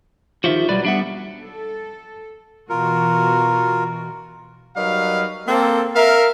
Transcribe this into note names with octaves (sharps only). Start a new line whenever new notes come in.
D#3 F3 F#4 G4 E5
B1 F#3 G3 B4 D5
G3 B3 D4 E5 F#5
A4
B2 E3 F4 F#4 A#4
F#3 G3 D#4 A#4 B4 F5
A#3 C4 A4
A#4 E5 F5